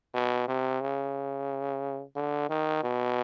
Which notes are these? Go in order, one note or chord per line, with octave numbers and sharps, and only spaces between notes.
B2
C3
C#3
D3
D#3
B2